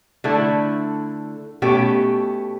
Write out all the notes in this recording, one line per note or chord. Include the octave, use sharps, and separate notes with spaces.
D3 A3 E4 A4
B2 A3 C#4 G4